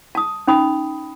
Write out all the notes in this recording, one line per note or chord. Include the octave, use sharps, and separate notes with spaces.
A5 D#6
C#4 D#4 B5 D#6